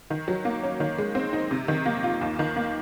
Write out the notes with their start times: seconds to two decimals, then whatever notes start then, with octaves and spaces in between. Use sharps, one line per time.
0.10 D#3
0.28 F#3
0.45 A#3
0.63 C#4
0.80 D#3
0.98 G#3
1.15 C4
1.33 D#4
1.51 C3
1.68 D#3
1.86 A#3
2.03 F4
2.21 D#2
2.39 D#3
2.56 A#3